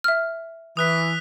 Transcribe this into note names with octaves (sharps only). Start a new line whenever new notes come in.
E5 F6
E3 D#6 F#6 B6